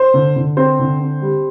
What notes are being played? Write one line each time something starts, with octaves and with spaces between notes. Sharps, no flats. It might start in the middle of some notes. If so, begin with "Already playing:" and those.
Already playing: C5
D3
D3
C4 C5
D3
C4
G3